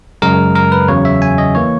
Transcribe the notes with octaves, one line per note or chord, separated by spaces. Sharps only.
F#2 C#3 G#3 A#4
A#4
B4
E2 C#3 F#3 C#5
E5
G#5
D#5
E3 A#3 C#5